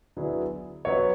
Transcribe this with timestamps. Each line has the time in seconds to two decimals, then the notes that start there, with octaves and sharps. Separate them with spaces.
0.17 D3 F#3 B3 E4 G#4
0.85 F#3 B3 F#4 C#5